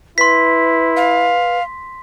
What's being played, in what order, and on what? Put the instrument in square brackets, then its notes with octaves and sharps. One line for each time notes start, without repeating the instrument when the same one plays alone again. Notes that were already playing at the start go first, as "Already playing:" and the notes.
[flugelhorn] E4 [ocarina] B4 [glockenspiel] C6 B6
[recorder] F5